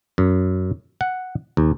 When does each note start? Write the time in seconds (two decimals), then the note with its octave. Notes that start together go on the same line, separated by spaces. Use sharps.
0.18 F#2
1.01 F#5
1.57 D#2